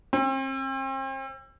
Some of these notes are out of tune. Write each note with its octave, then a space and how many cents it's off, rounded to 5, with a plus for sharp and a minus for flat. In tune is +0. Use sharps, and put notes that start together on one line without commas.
C4 +40